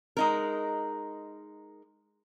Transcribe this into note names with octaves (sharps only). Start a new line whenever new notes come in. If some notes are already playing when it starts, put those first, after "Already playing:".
G#3 D#4 A#4